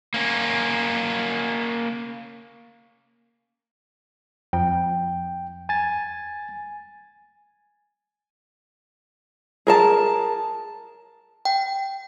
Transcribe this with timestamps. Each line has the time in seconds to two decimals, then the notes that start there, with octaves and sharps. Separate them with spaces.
0.14 A#3 C#4
4.53 F2 G5
5.69 G#5 A6
9.67 G#4 A#4 A5
11.45 G5